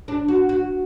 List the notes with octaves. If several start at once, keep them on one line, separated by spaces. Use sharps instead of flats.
D4
F#4
F#4